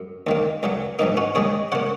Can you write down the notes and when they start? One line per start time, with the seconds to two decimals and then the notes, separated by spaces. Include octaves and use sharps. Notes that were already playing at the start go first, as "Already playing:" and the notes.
Already playing: F#2
0.27 D#2 D#3 A#3
0.63 C#2 C#3 F#3
0.99 A#1 G#2 D#3 A#3 D#4
1.17 C#4 F#4
1.35 D#2 D#3 G#3 G#4 C#5
1.72 C#3 A#3 C#5 F#5